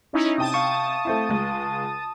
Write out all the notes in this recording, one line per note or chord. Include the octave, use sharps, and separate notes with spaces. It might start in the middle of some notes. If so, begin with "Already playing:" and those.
C#4 D#4 E4
C3 G5 A5 D#6
F5 C#6
A3 C4 E4
C#2 G#3